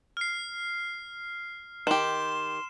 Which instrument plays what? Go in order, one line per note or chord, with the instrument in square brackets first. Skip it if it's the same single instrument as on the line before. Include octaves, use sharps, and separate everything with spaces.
[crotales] F6 C7
[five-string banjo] D#3 G4 [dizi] C6 [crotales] E7